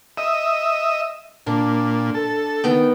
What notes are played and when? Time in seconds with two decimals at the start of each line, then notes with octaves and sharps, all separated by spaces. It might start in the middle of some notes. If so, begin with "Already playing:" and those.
0.17 D#5 E5
1.47 A#2 D4
2.15 A4
2.64 D#3 B3 G5